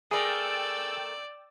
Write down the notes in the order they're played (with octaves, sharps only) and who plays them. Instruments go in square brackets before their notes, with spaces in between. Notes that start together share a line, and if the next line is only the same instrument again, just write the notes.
[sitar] A3 A#4 [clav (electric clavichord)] G#4 [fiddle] D5 [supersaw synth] G5 E6 A6